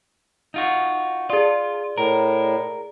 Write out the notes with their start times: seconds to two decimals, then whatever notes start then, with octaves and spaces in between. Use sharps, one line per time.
0.54 D#4 F4 F#4
1.30 F4 G#4 D5
1.98 A2 A#4